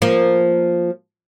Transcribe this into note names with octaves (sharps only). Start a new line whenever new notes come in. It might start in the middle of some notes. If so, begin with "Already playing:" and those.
F3 A#3